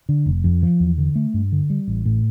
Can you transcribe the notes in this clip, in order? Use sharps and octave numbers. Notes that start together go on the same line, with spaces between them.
D3
F1
F2
F3
E2
D3
A3
G2
D3
G3
A1
A2